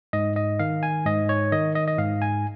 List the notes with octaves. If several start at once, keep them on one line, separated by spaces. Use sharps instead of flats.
G#2 D#5
D#5
D#3 F5
G#5
G#2 D#5
C#5
D#3 D#5
D#5
D#5
G#2 F5
G#5